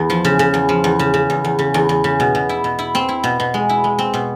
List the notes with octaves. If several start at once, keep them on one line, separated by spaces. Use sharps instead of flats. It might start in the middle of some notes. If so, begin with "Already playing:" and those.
Already playing: E2
F3
C#3
C#3
E2
F3
E2
C#3
C#3
E2
E2
C#3
E2
E2
C#3
B2
B2
E4
B2
E4
C4
E4
B2
B2
G#3
E4
G#3
C4
B2